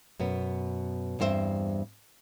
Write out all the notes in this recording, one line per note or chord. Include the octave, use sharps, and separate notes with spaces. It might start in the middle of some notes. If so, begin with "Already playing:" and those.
F#2 B2 B3
E2 G2 C4 C5 E5